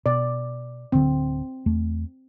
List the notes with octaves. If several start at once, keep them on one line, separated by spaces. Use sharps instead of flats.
B2 D5
D1 D3 C4
E2 A3